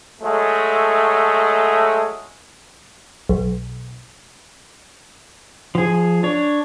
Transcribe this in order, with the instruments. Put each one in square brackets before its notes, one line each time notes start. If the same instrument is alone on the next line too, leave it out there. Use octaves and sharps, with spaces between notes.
[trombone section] F#3 G#3 A3
[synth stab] B1
[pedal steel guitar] F3 G#4
D4 C#5